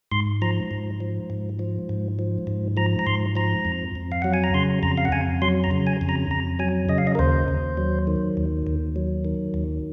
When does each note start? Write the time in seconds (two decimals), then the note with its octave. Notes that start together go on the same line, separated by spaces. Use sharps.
0.11 G#2 C6
0.42 F3 A#5
0.71 G#2
1.00 F3
1.30 G#2
1.59 F3
1.89 G#2
2.19 F3
2.47 G#2
2.77 F3 A#5
2.99 A#5
3.06 G#2 C6
3.36 F3 A#5
3.65 F2
3.95 F2
4.12 F5
4.22 F#3 F#5
4.34 G#5
4.44 A#5
4.54 C#3 C6
4.83 F2 A#5
4.98 F5
5.05 F#5
5.12 F2 G#5
5.42 F#3 C6
5.64 A#5
5.71 C#3
5.87 G#5
6.01 F2
6.09 A#5
6.31 F2 A#5
6.59 F#3 G#5
6.89 C#3 D#5
6.98 F5
7.07 D#5
7.15 A#4
7.19 D#2 C5
7.48 D#2
7.77 F#3
8.07 D#3
8.37 D#2
8.67 D#2
8.96 F#3
9.25 D#3
9.54 D#2